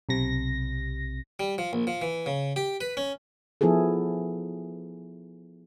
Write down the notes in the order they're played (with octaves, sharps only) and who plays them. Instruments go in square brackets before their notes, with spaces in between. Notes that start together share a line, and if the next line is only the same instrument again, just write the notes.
[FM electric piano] B1 C3 A#6
[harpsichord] G3
F3
A#1
F3
E3
C#3
G4
B4
C#4
[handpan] F3 B3 E4 G#4 A4